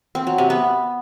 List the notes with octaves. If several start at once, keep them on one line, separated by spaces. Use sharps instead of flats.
C4
F#3
C3
B3